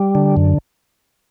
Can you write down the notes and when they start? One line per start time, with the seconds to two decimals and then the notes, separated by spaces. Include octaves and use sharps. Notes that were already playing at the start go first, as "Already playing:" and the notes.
Already playing: G3
0.15 D3
0.37 F#2